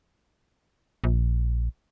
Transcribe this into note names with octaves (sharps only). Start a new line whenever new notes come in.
A#1